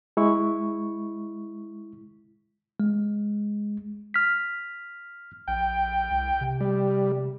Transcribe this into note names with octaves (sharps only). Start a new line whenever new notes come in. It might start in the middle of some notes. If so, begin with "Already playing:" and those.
G#3 E4 C#6
G#3
F6 B6
A#1 G5
C2
C3
G3